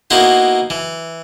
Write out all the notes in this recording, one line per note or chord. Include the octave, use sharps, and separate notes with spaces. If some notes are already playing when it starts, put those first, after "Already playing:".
A#3 B3 D#4 E4 F#4 C5
E3